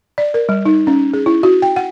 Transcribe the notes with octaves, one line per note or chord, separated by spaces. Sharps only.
D5
A#4
G3
D#4
C#4
G#4
E4
F#4
G5
F#5